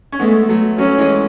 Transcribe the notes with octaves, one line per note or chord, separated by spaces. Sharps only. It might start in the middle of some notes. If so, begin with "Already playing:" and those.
C#4
G#3 A3 B3
F#3 A3
F#3 C#4
E3 G#3